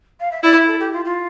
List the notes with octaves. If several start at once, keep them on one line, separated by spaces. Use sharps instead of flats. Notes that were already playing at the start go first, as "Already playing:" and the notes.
F5
E5
E4 D5
E5
A4
G4
F4
F4